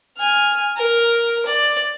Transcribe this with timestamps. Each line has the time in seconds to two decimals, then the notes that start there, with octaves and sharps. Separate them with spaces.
0.18 G#5 F6
0.76 A#4
1.46 D5